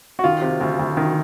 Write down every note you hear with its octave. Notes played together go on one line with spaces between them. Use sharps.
F#4
D#3 F4
C3
D2
D2
D#3